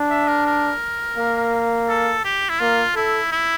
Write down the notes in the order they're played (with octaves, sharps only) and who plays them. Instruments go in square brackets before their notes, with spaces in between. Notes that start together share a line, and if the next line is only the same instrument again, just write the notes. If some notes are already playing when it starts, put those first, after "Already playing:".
Already playing: [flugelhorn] D4
[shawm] E5
A#4
A#4
[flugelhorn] A#3
[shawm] A4
G4
E4
[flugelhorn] A#3 [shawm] F4
[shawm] E4 [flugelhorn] A4
[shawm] E4